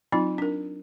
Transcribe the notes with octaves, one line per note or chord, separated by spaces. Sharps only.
F#3 C4 D#4 F4
D4 A#4